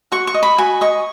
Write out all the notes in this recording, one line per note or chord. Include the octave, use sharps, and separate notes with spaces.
F#4 C#6
C#6
D#5
B5
F#4 G#5
D#5 C#6